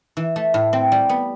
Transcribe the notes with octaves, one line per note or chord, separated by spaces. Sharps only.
E3
A3
A2
C4
G3
B3